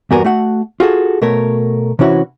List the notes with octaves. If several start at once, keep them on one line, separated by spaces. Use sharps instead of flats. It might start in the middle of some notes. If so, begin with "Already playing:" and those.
E2 G2 B3 F#4 A#4 G#5
A3 F#4 F#5
F4 F#4 G#4 A4
B2 A3 A#4 C#5
C3 E3 C#4 E4 F#4